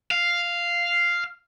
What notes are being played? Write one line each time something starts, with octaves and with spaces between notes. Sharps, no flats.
F5